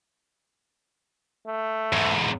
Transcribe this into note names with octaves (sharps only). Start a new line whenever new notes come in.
A3
E2 G#2